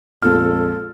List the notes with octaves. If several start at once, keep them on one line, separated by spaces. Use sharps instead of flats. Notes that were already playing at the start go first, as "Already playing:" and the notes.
A#1 F2 A#2 G#3 A4 F6